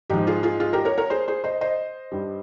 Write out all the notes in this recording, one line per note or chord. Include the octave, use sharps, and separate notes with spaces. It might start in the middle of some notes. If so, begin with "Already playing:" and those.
G#2 F3 D#4 G4
F4 G#4
F4 G#4
F4 G#4
G4 A#4
A#4 C#5
A#4 C#5
G#4 C5
G#4 C5
C5 D#5
C5 D#5
G2 G3